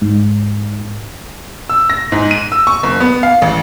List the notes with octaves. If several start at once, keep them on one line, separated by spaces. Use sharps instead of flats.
G#2
E6
A#6
G#2
D#7
E6
C#6
F#1
B3
F5
A1